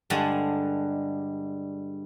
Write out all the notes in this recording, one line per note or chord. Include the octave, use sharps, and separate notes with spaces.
G2 D3 G#3